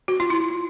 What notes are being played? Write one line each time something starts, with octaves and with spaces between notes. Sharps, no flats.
F#4
F4
E4